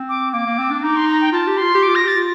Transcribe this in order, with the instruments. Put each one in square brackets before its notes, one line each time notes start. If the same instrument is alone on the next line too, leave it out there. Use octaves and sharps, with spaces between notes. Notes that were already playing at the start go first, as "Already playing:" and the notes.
Already playing: [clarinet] C4
[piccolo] D6
[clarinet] A#3 [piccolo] D6
[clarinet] A#3
C4
D4
[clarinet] D#4 [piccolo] D6
[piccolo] C6
A#5
G5
[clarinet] F4 [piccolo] A5
[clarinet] G4
[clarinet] F4 [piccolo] C6
[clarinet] G4
[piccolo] D6
[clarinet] F4
[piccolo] A#6
[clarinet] G4 [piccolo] A6
[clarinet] F4